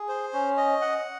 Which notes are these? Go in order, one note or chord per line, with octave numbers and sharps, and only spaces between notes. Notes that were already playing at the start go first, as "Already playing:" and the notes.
Already playing: G#4
C5
C#4
D#5
F#5